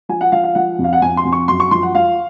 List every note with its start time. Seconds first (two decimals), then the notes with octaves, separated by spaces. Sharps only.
0.09 F3 G#5
0.21 F#5
0.32 F3 F5
0.44 F5
0.55 F3 F#5
0.79 F2
0.84 F5
0.93 F#5
1.02 F2 G#5
1.17 C6
1.25 F2
1.32 C#6
1.48 F#2 C6
1.60 C#6
1.71 F3 C6
1.83 F#5
1.95 F3 F5